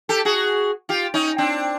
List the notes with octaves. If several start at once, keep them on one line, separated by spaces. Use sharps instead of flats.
G4 A4
F#4 G#4
F4 G4
C#4 D#4
C4 D4